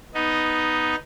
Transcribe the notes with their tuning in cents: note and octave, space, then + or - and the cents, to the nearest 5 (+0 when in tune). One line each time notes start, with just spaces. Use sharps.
B3 +0 D#4 +0 D#5 +0